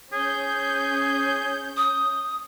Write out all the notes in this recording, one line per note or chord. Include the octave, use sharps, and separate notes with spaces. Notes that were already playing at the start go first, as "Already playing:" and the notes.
C#4 G#4 G6
D#6